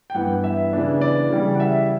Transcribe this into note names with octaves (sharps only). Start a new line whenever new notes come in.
G5
G2 E3 B3 F#5
E5
C#3 E3 B3 D4
D5
C#3 E3 G3
F#5
E5